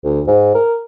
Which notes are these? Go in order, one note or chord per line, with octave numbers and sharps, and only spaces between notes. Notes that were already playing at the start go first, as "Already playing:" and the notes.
D2
G#2
A#4